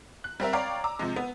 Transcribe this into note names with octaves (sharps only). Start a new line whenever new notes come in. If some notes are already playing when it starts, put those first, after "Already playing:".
F#6
G3 C4 A#4 E5
C#5 D5 F5 G5 A#5 D6
A#5 D6 E6
C3 F3 G#3
B3